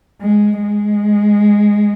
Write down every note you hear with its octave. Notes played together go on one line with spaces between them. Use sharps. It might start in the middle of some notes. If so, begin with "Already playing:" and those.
G#3
G#3